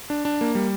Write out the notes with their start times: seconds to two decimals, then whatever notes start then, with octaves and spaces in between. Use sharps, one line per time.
0.10 D4
0.25 D4
0.41 A#3
0.55 G3